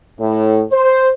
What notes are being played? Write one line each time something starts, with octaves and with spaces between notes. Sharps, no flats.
A2
C5